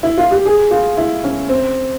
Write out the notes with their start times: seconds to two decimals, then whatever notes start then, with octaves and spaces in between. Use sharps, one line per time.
0.03 E4
0.17 F4
0.31 G4
0.45 G#4
0.71 F4
0.97 E4
1.24 C#4
1.49 C4